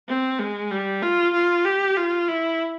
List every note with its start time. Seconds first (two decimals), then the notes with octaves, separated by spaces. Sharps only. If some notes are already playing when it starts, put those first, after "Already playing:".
0.08 C4
0.39 G#3
0.71 G3
1.02 F4
1.34 F4
1.65 G4
1.96 F4
2.28 E4